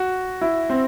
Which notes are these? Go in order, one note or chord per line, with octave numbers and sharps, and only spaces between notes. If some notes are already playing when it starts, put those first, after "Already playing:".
Already playing: F#4
E4
C4